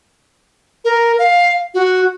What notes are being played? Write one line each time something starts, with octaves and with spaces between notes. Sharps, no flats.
A#4
F5
F#4